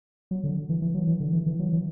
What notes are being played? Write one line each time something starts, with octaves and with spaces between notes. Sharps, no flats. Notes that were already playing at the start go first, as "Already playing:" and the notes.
F#3
D3
E3
E3
F#3
E3
D3
E3
E3
F#3
E3